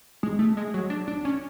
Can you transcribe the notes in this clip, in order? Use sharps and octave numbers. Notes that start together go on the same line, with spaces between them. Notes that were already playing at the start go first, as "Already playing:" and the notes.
G#3
A3
G#3
F#3
D4
D4
C#4